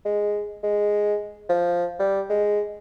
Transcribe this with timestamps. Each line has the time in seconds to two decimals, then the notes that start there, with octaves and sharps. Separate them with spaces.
0.05 G#3
0.63 G#3
1.49 F3
1.99 G3
2.30 G#3